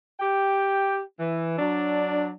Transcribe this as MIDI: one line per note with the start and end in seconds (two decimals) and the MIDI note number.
0.20 1.00 67
0.20 1.00 79
1.19 1.58 52
1.58 2.31 54
1.58 2.31 62